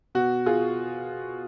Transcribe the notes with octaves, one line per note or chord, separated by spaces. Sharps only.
B2 F#4
F4 G#4